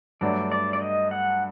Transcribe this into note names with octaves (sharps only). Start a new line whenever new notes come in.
G2 F#3 A3 D4 D5
D5
D5
D#5
F#5